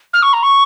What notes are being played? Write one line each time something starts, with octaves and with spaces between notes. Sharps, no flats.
F6
C#6
A#5
C#6